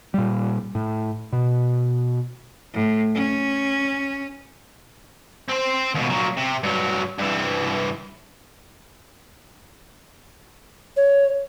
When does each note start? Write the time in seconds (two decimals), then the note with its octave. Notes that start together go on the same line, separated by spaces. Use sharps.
0.14 A#2 G3
0.75 A2
1.33 B2
2.73 A2
3.14 C#4
5.48 C4 C5
5.94 D#2 B2
6.10 A#2 F#3
6.37 C3
6.63 G2 F#3
7.18 G2 E3
10.96 C#5